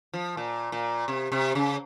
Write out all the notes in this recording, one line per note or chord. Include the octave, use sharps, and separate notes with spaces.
F3
A#2
A#2
C3
C3
C#3